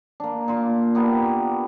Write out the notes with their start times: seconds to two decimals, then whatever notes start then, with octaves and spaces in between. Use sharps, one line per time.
0.20 A#3 D4
0.48 A#2 F4
0.95 A#3 B3 D4 G4